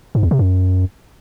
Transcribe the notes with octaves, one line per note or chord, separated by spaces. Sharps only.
G#2
E2
C3
F#2